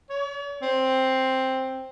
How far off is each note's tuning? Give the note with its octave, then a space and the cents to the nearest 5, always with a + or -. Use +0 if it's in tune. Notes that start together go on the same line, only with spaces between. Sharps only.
C#5 +45
C4 +5